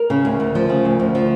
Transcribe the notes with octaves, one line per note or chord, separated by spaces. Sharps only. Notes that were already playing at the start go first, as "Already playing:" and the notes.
Already playing: A#4
C#3
D2
D2
F3
C#3
D2
D2
F3